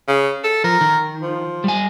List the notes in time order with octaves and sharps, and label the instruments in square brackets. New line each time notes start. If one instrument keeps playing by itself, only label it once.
[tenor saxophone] C#3
A4
[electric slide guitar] F3 [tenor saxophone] A#4
[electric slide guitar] D#3
[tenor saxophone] F3
[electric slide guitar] G3 G#5